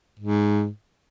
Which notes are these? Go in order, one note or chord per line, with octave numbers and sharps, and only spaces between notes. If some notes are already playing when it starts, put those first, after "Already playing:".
G#2